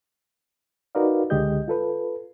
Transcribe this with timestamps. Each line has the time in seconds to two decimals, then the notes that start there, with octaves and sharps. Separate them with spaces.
0.95 D#4 F#4 A#4 B4 D5 F5
1.30 C#2 D3 G#3 G4 D#5 G6
1.68 F4 A4 B4